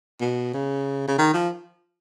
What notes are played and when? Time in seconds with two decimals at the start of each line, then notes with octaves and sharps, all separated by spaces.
0.21 B2
0.54 C#3
1.08 C#3
1.19 D#3
1.34 F3